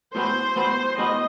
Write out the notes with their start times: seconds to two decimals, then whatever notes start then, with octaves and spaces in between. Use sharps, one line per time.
0.15 A2 G3 B3 F#4 B4 C5
0.56 A2 G3 B3 F#4 B4
0.98 A2 G3 B3 F#4 B4 D#5